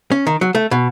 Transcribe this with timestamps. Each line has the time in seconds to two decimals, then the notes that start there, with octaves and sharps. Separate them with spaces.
0.12 C#4
0.27 D#3
0.41 F#3
0.55 A3
0.71 B2